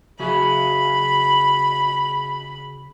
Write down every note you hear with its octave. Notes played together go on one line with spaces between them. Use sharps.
C#3 F#4 G#4 B5